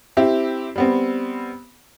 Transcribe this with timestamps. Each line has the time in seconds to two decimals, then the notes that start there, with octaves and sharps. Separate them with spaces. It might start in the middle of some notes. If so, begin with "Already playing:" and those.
0.17 C4 E4 G4
0.76 G3 B3 C4